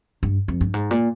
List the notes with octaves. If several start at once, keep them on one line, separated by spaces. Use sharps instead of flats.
G2
F2
G2
G#2
A#2